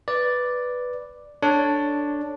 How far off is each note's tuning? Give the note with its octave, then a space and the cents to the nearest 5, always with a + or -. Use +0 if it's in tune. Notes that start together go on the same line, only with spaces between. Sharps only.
B4 +0 D5 +0
D4 +0 A4 +5 C#5 +0